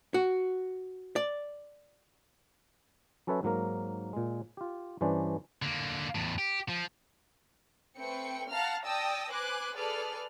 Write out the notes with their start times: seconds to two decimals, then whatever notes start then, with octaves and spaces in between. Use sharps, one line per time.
0.14 F#4
1.16 D5
3.27 F#3 C#4 A4 B4 C#5 E5
3.43 G#2 F#3 A#3 A#4
4.13 A#2 G#3
4.57 F4 G4
5.01 G2 E3 C#4 D4 C5 D5
5.62 D3 A#3
6.15 E2 A2
6.38 G4
6.69 F3
7.98 A3 C4 B4 G5 C#7
8.50 F5 F#5 A5 A#5 F6
8.85 D5 G5 A5 D#6 E6 A#6
9.31 B4 C5 G#5 D6 F#6
9.75 G#4 A4 B4 D5 F6